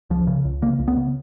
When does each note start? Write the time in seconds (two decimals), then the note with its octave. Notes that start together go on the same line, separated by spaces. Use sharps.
0.10 C#2 F3
0.27 C#3
0.45 C#2
0.62 C#3 A#3
0.79 C#2
0.88 B3
0.96 C#3